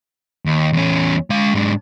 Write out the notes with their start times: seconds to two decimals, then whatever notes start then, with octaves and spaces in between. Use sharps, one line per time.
0.46 D#2
0.73 E2 C#4
1.30 G#3 F5
1.54 G#2 D4